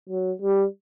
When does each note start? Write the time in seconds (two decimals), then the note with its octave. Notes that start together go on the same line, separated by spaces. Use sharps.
0.09 F#3
0.42 G3